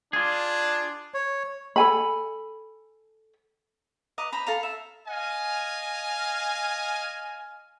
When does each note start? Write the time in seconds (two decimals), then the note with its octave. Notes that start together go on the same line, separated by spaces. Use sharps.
0.13 D4 F4 G#4
1.14 C#5
1.76 A4 G#5 B5
4.18 B4 D#5 A#5 D6
4.32 C5 A#5 B5
4.47 A4 F5 A#5
4.63 E5
5.08 D#5 F5 G#5